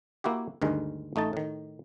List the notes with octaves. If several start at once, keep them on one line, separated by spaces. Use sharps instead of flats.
A#3 E4 F#4 G4
D2 G2 D#3 G#3
A1 A3 D#4 A5
A2 D#3